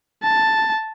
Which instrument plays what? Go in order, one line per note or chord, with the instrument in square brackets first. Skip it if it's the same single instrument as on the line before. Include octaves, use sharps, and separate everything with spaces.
[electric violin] A5